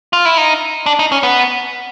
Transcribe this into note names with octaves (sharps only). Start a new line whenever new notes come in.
F4
E4
D#4
D4
D#4
C#4
B3